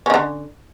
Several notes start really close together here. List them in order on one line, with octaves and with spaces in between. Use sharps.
C#4 D#3 D3